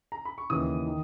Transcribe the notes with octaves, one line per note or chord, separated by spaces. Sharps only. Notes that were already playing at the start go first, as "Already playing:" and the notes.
A#5
B5
C#6
D#2 C#3 E3 D#6
D#3